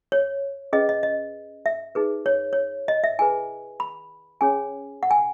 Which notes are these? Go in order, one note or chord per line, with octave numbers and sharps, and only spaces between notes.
C#5
C#4 G#4 B4 D#5
D#5
D#5
E5
D#4 G#4 B4
C#5
C#5
D#5
E5
E4 G#4 B4 G#5
B5
C#4 G#4 C#5 G#5
F#5
G#5